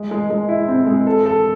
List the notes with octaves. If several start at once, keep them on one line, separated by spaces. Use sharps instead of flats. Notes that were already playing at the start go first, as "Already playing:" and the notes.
Already playing: G#3
G#3
G#3
E4
C4
G#3
A4
A4